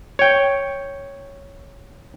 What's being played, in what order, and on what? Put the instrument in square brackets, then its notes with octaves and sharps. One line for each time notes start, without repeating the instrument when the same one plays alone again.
[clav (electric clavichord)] C#5 G5